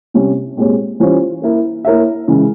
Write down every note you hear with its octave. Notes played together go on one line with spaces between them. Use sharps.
C3 G3 C#4
A#2 G#3 C4 G4 C#5
E3 G3 C#4 F4 C5
A#3 E4 A#4
A#3 E4 A#4 C#5 E5
C#3 E3 G#3